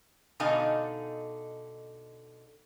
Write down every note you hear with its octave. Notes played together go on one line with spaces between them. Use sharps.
B2 D3 D#4 A4 F5 G#5